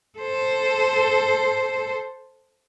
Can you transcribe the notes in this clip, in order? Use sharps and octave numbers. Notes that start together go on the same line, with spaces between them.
A4 C5